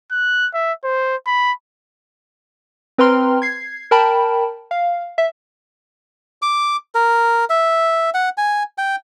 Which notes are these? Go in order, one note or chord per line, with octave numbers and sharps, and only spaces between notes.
F#6
E5
C5
B5
C4 B4 G5 A#5 C6 F6
G#6 C7
A#4 G5 A5 B5
F5
E5
D6
A#4
E5
F#5
G#5
G5